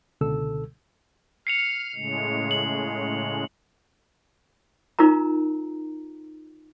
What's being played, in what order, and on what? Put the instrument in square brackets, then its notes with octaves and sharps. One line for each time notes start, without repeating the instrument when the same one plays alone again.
[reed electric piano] C#2 B2 D3 A4 E6
[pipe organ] F6 [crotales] C7 C#7 F7
[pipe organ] A2 C#3 G#3
[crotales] F#7
[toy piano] D#4 F4 A#4 A#5